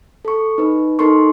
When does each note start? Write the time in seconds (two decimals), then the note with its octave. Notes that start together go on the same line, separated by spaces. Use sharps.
0.25 A4 C#6
0.58 D#4 B4
0.99 D#4 A4 A#4 C6 C#6